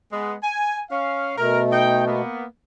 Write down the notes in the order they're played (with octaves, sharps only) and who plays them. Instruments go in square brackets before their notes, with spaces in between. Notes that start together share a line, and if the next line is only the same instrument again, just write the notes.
[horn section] G#3 B3
G#5
C#4 F5
[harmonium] B2 A3 [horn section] A#4
[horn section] D#4 G5
A#3 B3